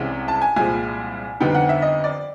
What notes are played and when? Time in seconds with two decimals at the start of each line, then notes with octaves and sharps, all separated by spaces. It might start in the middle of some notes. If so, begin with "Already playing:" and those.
Already playing: C2 C3 E3 G#3 C#4
0.28 A5
0.42 G#5
0.56 C2 A#2 F3 G#3 G#5
1.40 F2 D3 G3 B3 D#4 G5
1.55 F#5
1.69 E5
1.82 D#5
2.04 D5